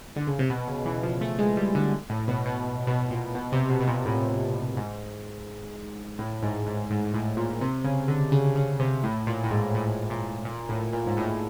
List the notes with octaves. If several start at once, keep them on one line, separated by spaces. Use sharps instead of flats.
D3
C#3
C3
B2
C#3
E3
F3
A3
G#3
G3
D3
A2
B2
B2
B2
A#2
B2
C3
B2
B2
A#2
A2
G#2
A2
G#2
G#2
G#2
G#2
A2
A#2
C3
C#3
D3
C#3
C#3
C3
A2
A#2
A2
G#2
A2
A#2
A#2
A2
A#2
G#2
A2